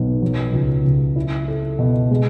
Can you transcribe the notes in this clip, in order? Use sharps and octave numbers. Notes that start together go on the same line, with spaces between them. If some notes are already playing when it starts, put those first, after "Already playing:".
Already playing: B1 B3
F#3
C#2
C#2
E4
A4
B2
G#3